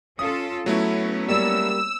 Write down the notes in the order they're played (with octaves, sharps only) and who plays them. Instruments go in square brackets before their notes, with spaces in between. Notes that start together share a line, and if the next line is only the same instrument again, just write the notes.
[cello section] C#4 F4 A4 [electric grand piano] D#6
[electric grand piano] F#3 A3 E4 [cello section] B3 C#4
[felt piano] G3 A#3 D5 [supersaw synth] E6